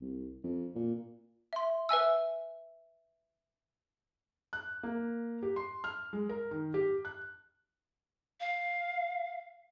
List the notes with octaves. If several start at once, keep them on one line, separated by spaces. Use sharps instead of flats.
C2
F2
A#2
E5 C6
B4 E5 G#5 E6
F#6
A#3
G4
C6
F6
G#3
A#4
D#3
G4
F#6
F5